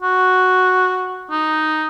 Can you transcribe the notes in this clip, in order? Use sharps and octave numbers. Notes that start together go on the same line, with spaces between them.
F#4
D#4